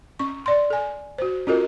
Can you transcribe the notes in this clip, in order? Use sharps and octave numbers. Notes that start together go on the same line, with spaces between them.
C#4 C#6
D5 C6
A4 G#5
F#4 C5
C#4 F4 F#4 A4 A#4 D#5